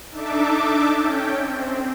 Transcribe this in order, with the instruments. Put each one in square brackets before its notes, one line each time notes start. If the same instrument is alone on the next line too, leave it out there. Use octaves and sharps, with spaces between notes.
[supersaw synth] D4 D#4 A4 E5 A5 D6
C#4 G5
C4